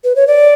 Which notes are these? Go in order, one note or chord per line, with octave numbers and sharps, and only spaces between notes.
B4
C#5
D5